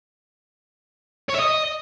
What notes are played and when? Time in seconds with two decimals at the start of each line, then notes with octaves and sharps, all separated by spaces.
1.29 C#5
1.34 E5
1.40 D#5